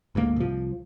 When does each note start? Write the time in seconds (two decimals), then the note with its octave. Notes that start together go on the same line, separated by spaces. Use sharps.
0.15 G1 D2 G#2 A#3
0.36 C2 F3